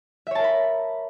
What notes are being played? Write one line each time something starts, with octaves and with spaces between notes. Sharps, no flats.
A#4 C#5 E5 A5 B5